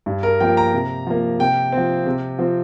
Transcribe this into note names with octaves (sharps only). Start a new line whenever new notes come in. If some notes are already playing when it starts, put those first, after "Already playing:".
G2
A#4
F3 A#3 G5
A#5
C3
F3 A#3
C3 G5
F3 C4
C3
F3 C4